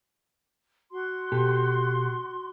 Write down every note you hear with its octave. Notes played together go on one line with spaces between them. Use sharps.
F#4 C6
B2 G4 A4